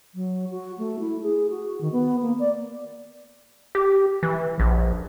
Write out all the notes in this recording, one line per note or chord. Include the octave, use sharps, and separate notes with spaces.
F#3
F#4
A3
E4
G#4
F#4
D#3
B3
A#3
D5
G4
E3
A#1